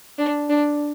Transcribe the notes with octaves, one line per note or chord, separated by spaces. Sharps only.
D4
D4